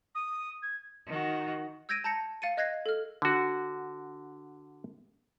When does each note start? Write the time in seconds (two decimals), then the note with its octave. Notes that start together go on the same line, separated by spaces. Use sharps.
0.15 D#6
0.63 G#6
1.07 D#3 F#4
1.89 E6 G6 G#6 A#6 D7 D#7
2.04 A5 A#5 G6 A#6 C#7
2.42 F5 A6 C#7 D#7
2.57 D#5 F#6 G#6 A#6 C7
2.86 A4 F6
3.22 D3 F#4